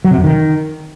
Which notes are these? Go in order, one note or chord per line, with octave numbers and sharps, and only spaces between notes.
F#3
C3
F2
D#3